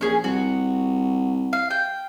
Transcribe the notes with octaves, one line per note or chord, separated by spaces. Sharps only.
A#1 C#4 G#4
C2 F#4
F5
G5